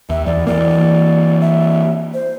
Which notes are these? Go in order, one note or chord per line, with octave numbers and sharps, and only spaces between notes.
D#2 E5
E2 D5
E3 A#3 D5
E5
C5